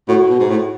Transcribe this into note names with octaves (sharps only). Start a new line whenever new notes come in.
A2 F#4
B2
G#2
A2